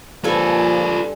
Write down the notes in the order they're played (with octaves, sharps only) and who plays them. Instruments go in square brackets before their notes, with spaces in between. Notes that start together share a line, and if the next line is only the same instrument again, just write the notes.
[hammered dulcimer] G2 [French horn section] F3 A#3 [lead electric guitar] F4 B4 [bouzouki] A4 G#5